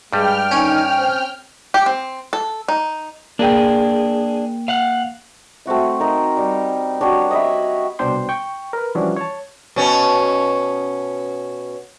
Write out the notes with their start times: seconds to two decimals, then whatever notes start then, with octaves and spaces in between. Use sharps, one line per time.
0.13 G2 G3 G#3 G5 F6
0.51 D3 D#3 C#4 D#4
0.97 C4
1.74 G4
1.86 C4
2.33 A4
2.68 D#4
3.39 A#3 D4 G#4 G5
4.68 F5 F#5
5.66 A3 C4 F#4 E5
6.00 D#4 A#4 D#5
6.37 G3
7.01 D4 F#4 G4 C#5
7.31 D#5 E5 B5
7.99 C2 B2 D4 C5 G5 C6
8.29 G5 C#6
8.73 A#4 B4
8.95 E3 F3 G3 C#4 D4 F#4
9.16 C#5 A5
9.76 B2 C#4